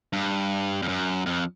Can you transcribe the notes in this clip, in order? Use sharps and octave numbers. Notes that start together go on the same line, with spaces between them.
G2
F2
F#2
F2